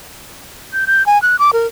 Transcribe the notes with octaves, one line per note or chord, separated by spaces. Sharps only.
G6
G6
G#5
F#6
D6
A#4